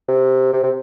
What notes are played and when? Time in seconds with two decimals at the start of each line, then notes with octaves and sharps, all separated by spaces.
0.08 C3
0.53 C3
0.63 C3